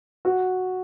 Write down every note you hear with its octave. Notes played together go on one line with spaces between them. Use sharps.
F#4